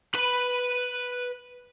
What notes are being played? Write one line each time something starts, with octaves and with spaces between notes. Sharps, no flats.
B4 B5